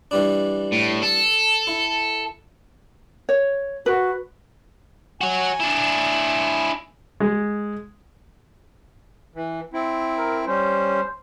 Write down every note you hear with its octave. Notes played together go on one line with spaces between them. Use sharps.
E3 G3 D4
A2
A4
E4
C#5
F#4 B4
F#4 C#5 G#5
D4 E4
G#3
E3
C4 E4
A#4
G3 C#4 C5